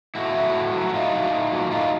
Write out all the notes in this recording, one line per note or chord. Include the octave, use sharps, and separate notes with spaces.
A2 E4 F#4
F#3 A3
A2
F#3 A3
F#4
A2 D#4 F4
F#3 A#3
A2
F#3 A#3
A2 D#4 F4